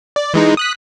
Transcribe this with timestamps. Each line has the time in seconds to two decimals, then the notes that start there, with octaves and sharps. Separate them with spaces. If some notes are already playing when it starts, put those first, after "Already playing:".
0.16 D5
0.34 E3 G#3 D#4
0.57 D#6 F#6 B6